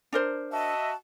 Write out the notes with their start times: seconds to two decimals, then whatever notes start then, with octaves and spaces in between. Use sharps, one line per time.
0.13 D4 A#4 C5
0.52 F#4 D#5 E5 A5